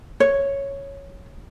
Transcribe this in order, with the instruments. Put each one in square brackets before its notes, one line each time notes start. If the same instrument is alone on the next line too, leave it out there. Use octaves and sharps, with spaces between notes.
[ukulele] C#5